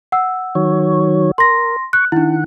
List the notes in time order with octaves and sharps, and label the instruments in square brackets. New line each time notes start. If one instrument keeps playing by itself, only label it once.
[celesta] F#5 E6
[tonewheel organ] D#3 F#3 C#5
[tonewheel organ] A#4 [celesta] C6 A#6
[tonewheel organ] C#6 [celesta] F#6
[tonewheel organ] D#3 F#5 [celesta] D4 E4